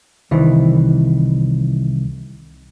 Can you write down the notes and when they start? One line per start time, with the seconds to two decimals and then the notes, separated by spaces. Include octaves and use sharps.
0.31 C2 D#3 E3